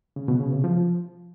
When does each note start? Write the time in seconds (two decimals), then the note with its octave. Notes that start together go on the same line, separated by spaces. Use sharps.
0.16 C#3
0.28 B2
0.40 C#3
0.52 C3
0.64 F3